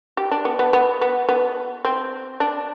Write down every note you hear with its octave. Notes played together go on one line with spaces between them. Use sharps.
G4
D4
B3
B3
B3
B3
B3
C4
D4